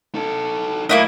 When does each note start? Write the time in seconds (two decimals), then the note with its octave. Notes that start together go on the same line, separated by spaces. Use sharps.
0.15 D#4 A4
0.89 F#2 A2 A#3 E4 D#5